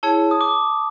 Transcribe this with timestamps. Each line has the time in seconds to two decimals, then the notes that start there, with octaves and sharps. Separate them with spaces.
0.03 E4 G#4 C#5 A5
0.31 D#6
0.41 D6